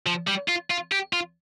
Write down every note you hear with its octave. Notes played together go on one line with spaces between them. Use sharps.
F3
G3
F4
F4
G4
F4